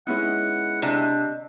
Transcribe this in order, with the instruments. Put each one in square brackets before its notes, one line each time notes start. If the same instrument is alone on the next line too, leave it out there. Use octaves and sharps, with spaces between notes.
[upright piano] G#3 B3 E4 [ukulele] C#4 D#4 [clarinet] F#5
[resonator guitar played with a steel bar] C3 [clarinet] D4 [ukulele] D5 D#5